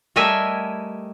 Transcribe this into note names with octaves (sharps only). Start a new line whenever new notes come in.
G3 A3 A#4 D#5 E5 G#5